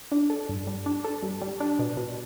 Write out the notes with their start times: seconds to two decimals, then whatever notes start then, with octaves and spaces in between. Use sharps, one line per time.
0.12 D4
0.30 A4
0.49 G2
0.67 G3
0.86 D4
1.05 A4
1.22 G2
1.42 G3
1.60 D4
1.79 B2
1.97 B2